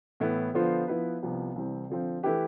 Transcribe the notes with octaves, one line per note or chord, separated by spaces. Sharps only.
A2 E3 B3 E4
D3 F3 B3 F4 C5
F3 B3 E4 B4
C2 C3 F3 B3
C2 C3 E3 G3 C4
D3 F3 C4
E3 A3 E4 G4 B4